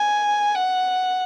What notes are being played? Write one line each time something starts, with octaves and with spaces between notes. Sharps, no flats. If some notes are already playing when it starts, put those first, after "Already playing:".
Already playing: G#5
F#5